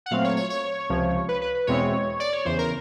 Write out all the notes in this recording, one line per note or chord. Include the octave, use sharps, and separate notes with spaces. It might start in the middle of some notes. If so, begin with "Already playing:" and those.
F#5
A#2 F#3 A3 C4 F5
C#5
C#5
C#5
C#2 C3 F3
B4
B4
B4
E2 B2 G#3 C4 E4 C#5
D5
C#5
E2 C#3 E3 C5
A#4